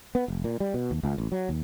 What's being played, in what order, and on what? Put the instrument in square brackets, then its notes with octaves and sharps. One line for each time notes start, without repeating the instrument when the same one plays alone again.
[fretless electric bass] B3
F1
A#2
G3
B2
D#2
C#2
A1
F#3
D#2